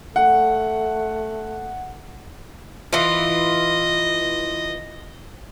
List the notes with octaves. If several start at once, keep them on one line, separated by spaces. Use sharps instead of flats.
A3 F#5
E3 F4 D#5